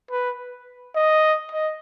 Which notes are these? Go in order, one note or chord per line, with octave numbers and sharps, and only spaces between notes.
B4
D#5
D#5